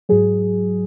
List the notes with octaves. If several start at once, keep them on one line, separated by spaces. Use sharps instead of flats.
G#2 F#3 G#4